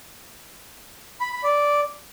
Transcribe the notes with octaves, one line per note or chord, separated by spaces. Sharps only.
B5
B5
D5